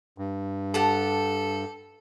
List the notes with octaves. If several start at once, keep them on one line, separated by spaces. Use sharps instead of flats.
G2
G4 A4 F#5 A5